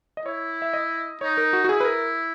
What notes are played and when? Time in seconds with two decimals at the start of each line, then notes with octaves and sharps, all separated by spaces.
0.17 D#5
0.26 E4 C#5
0.62 E5
0.73 D#5
1.21 D#4 C#5
1.37 A#4
1.53 F#4
1.64 F#4
1.69 E4 G#4
1.80 B4
1.85 A#4